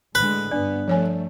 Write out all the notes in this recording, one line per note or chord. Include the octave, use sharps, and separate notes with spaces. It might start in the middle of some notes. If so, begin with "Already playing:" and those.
A2 D3 G#3 B4
G2 B3 D4 D5
F3 A3 C#5 G#5